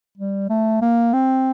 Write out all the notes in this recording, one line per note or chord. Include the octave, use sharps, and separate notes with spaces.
G3
A3
A#3
C4